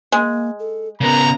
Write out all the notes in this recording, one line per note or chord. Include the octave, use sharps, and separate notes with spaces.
G#3 A#3
A4
C#3 B3 A#4 A#5